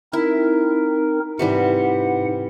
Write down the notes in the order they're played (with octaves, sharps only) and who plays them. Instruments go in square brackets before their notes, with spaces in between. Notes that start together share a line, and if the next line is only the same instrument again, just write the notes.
[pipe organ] C4 D#4 A#4 [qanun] E4
[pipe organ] G#2 F#5 [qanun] C3 E3 G3